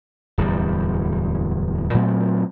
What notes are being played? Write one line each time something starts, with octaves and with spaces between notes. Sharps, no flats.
D1 E2 G3
A#2 F#3 A3 C4